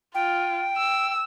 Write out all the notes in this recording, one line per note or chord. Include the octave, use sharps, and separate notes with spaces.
F4 G5
E6